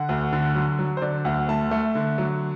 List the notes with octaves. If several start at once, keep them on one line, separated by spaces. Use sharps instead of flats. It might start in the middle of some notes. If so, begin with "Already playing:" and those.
Already playing: D3 F#5
D2
D3
F#3
F#3
C5
D3 D5
D2 F#5
A3 A5
A3
D3
F#3